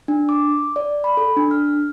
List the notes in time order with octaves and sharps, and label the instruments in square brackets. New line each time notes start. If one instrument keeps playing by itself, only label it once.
[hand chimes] D4
D6
D5
B5
A4
D4
F6